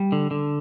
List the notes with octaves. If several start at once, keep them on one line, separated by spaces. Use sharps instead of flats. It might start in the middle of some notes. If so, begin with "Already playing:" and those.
Already playing: G3
D3
D3